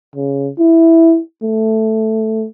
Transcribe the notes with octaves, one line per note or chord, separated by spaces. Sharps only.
C#3
E4
A3